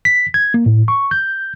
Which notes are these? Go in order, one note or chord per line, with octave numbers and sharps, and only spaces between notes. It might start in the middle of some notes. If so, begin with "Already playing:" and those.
B6
G#6
A#3
A2
C#6
G6